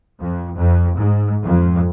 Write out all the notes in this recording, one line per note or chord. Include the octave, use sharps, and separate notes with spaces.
F2
F2
G#2
F2